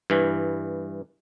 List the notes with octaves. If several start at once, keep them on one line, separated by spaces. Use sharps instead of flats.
G2 E3